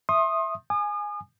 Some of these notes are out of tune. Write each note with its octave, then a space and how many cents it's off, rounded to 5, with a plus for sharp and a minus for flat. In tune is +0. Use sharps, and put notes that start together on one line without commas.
E5 +0 C6 +35 D#6 -5
G#5 +0 D#6 -40